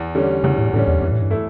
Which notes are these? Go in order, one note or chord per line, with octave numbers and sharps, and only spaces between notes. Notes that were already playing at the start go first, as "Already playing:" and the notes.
Already playing: E2
D3 G3 C#4
E2 C#3
A2
A2 D3 G3 C#4
E2
F2 E3
A2
G2
A3 E4